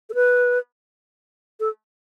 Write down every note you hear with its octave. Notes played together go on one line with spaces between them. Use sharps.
A4
B4
A4